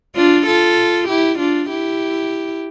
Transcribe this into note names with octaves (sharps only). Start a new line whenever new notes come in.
D4 F4
F4 A4
E4 G4
D4 F4
E4 G4